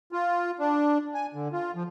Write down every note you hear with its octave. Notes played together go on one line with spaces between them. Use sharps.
F4
D4
G#5
D3
F4
F3